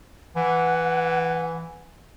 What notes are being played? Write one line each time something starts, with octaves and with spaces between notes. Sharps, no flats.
E3 F#5